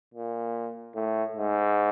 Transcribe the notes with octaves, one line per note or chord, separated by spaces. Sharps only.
A#2
A2
G#2